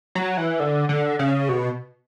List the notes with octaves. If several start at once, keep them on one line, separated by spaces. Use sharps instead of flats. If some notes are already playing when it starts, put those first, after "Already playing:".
F#3
E3
D3
D3
C#3
B2